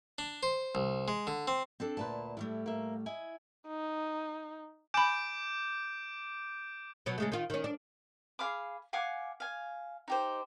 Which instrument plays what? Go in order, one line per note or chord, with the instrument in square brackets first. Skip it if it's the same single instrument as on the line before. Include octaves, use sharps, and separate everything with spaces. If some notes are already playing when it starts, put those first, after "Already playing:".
[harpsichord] D4
C5
C2
G#3
D3
C4
[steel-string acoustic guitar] C4 D4 A4
[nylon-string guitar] D2 A#2 B4 [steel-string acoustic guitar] A5
[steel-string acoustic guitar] A2 G3 A3 [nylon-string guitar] E4
[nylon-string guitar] A#3 E5
E4 D#5 G#5
[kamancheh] D#4
[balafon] G#5 B5 [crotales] D6 G6 D7
[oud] B2 F#3
C#3 G#3 A3
D#3 F4
D#3 C#4
D4
[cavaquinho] G#4 F5 B5 D6
F5 F#5 G#5 D6
F5 G#5
D#4 G4 C5